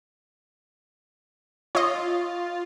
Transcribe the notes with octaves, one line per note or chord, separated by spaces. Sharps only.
F4 C#5 D#5